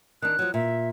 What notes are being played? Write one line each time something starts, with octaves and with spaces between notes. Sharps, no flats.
D#3 D4 F#6
F3 F#3
A#2 E5